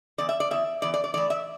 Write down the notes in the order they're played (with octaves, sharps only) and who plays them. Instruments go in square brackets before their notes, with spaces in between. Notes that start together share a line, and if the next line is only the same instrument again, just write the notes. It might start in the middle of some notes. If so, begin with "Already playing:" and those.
[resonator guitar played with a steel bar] E2 E3 D5
E5
D5
E2 E3 E5
E2 E3 D5
D5
D5
A2 E3 D5
E5